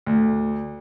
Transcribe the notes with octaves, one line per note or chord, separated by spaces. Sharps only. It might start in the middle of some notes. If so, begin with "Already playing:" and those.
D2